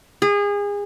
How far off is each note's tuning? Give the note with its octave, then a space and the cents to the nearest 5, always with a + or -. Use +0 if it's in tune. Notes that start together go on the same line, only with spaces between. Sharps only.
G#4 -30